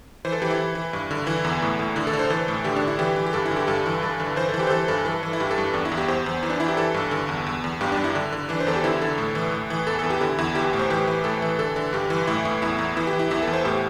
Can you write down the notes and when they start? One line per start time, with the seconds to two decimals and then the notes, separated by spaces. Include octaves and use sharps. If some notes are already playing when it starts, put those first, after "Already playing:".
0.25 E3 C5
0.32 A4
0.42 E3 G4
0.50 E4
0.59 E3
0.75 E3
0.93 G2
1.11 D3
1.27 E3 E4
1.45 E2
1.62 A2
1.79 A2
1.96 D3 E4
2.07 A4
2.13 D3
2.19 C5
2.30 E3 A4
2.48 A2
2.64 D3 G4
2.76 D4
2.81 D3
2.88 E4
2.99 E3 G4
3.16 E3
3.26 G4
3.33 G2 A4
3.46 E4
3.51 D3
3.57 G4
3.67 G2 A4
3.86 E3
4.02 G2 A4
4.20 D3
4.36 E3 C5
4.49 A4
4.54 E3
4.59 G4
4.67 C5
4.70 E3 A4
4.88 G2 A4
5.05 E3 A4
5.23 E3
5.33 E4
5.40 G2 G4
5.51 A4
5.58 G2
5.74 E2 D4
5.85 E4
5.92 E2
5.97 G4
6.08 E2 C5
6.26 E2
6.43 E3
6.50 D4
6.60 E3 E4
6.68 G4
6.77 E3 A4
6.94 G2
7.11 D3
7.29 E2
7.46 E2
7.64 E2
7.81 G2 G4
7.92 D4
7.97 G2
8.04 E4
8.15 D3 D4
8.32 D3
8.49 E3 D4
8.60 C5
8.67 E2 A4
8.76 G4
8.84 D3 E4
9.01 D3 A4
9.18 A2
9.35 E3
9.52 A2
9.70 E3
9.87 E2 A4
9.99 A4
10.04 E2
10.10 G4
10.21 D3 E4
10.38 E2 E4
10.55 E3 G4
10.73 A2
10.79 C5
10.90 E3 G4
11.07 E3
11.24 A2 A4
11.42 E3
11.59 D3 A4
11.76 D3
11.93 G2 G4
12.10 E3
12.27 A2 E4
12.45 A2 E4
12.62 E2 E4
12.79 E2
12.97 E3 E4
13.07 G4
13.13 E3
13.19 E4
13.31 E2 E4
13.43 A4
13.47 E2
13.53 C5
13.65 A2 G4